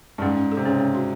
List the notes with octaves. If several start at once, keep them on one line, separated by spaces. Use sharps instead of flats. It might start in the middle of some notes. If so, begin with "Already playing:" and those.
G2
G#2 C#4
C#4
A4
C3
C#3 C#4
C#4
F#4